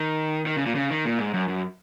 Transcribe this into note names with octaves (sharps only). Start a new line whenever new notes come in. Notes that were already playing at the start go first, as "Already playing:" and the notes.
Already playing: D#3
D#3
C#3
A#2
C#3
D#3
A#2
G#2
F#2
F#2